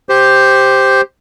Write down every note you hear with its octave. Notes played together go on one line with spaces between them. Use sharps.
G4 C5